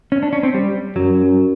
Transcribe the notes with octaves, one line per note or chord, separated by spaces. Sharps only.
C#4
D4
C#4
C4
G3
F#2 F#3